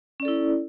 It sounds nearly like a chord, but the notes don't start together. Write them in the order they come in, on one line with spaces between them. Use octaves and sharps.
C#4 D5 A4 E4